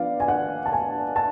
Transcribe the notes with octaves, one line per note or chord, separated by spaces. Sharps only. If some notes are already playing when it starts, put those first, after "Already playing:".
Already playing: F3 B3 D4 D5 F5
G#5
F#5
A5
G#5
A5